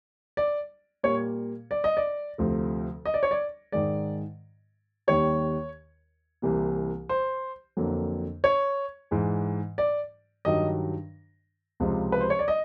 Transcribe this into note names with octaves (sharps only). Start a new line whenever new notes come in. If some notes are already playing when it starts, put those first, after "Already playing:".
D5
A#2 G3 A#3 C#5
D5
D#5
D5
D2 C3 F3 A3
D#5
D5
C#5
D5
G#2 D#3 G#3 D5
D#2 D#3 G3 C#5
C2 C3 E3 G3 A#3
C5
F2 D3 F#3 A#3
C#5
G#2 E3 G#3
D5
G2 D#3 F#3 D#5
C#2 C3 F3 G#3
B4
C5
C#5
D5
D#5